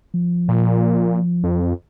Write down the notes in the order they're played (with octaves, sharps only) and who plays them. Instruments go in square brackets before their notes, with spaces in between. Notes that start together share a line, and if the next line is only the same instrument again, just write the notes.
[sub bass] F3
[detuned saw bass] A#2
F2